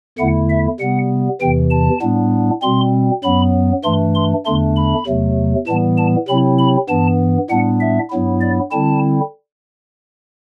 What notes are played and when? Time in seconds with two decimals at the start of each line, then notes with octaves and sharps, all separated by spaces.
0.19 E2 D3 A3 E4 F#5
0.50 E5
0.80 C3 G3 B3 F#5
1.41 E2 C3 E3 G5
1.71 A5
2.01 A2 G3 B3 D4
2.62 B2 G3 C4 C6
3.23 F#2 F#3 B3 B5
3.84 G2 E3 A3 D4 C6
4.15 C6
4.46 E2 D3 A3 D4 C6
4.76 B5
5.07 E2 C3 F#3 A3
5.67 A2 E3 G3 B3 A5
5.98 A5
6.28 C3 F#3 C4 E4 B5
6.59 B5
6.89 G2 E3 B3 A5
7.50 A2 G3 B3 D4 F#5
7.80 E5
8.11 G2 F#3 B3 E4
8.41 D5
8.72 D3 G3 C4 E4 A5